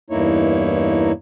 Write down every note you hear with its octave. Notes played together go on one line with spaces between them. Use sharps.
E2 G2 A#3 D#4 E4 C#5